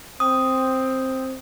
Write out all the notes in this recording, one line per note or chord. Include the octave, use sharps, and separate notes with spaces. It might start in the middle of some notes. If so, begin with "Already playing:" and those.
C4 D#6